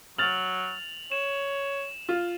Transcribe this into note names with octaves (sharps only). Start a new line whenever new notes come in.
F#3 F6 A6 F7 F#7
C#5 E7
F4